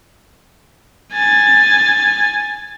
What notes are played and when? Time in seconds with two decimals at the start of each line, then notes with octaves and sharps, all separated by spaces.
1.14 G#5 A6